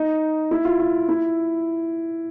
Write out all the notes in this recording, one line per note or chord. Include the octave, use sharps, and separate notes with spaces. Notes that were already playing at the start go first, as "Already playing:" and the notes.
Already playing: D#4
E4
F4
F4
E4